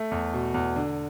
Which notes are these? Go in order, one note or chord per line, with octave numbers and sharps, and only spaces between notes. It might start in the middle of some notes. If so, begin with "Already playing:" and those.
Already playing: A3
E2
B2
E2
D3